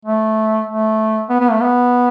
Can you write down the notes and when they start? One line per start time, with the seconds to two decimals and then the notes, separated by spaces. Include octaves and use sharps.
0.05 A3
0.68 A3
1.30 B3
1.41 B3
1.51 A3
1.61 B3